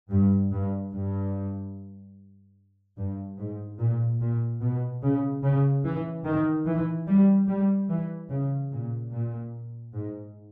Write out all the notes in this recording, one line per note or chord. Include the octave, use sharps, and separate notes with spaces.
G2
G2
G2
G2
G#2
A#2
A#2
B2
C#3
C#3
E3
D#3
E3
G3
G3
E3
C#3
A#2
A#2
G#2